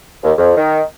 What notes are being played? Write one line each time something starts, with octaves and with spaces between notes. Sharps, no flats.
D#2
F2
D#3